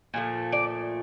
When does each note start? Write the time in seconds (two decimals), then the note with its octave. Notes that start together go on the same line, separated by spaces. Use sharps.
0.14 A#2 F3 A3
0.52 D5